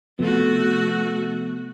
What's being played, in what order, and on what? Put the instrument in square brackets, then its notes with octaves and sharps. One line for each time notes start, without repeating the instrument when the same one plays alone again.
[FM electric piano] C3 F3 B3 [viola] A3 F#4